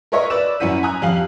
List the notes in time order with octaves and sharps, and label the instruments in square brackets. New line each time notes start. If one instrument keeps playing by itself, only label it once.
[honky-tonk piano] A#4 B4 C#5 D#5 E5 C#6
B4 D5 D6 E6 E7
F#2 C#4 E4 F#5 B6 D#7
G#5 A#5 D#6 F#6
F2 G4 F5 F#7